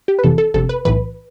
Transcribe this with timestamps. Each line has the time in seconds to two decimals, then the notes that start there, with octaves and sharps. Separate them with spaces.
0.08 G4
0.19 B4
0.23 G1 F2 C3 E3 A4
0.38 A4
0.54 G1 F2 C3 A4
0.69 B4
0.85 B1 A2 E3 B4